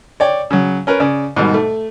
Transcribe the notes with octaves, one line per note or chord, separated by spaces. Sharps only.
C#5 D5 G5
C#3 F#3
C#4 A#4 B4
C#3 D5
G#2 B2 D#3 G3
A3